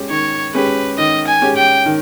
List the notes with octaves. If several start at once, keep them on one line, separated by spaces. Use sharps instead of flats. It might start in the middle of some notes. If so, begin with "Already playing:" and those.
Already playing: G#3 C#4 G4
D#3 C#5
G#3 C#4 G4 B4
D#3 D#5
G#5
G#3 C#4 G4
G5
D#3